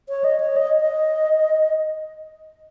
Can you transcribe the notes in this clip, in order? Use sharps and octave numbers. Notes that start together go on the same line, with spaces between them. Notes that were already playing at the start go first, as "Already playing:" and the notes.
C#5
D#5
C#5
D#5
D#5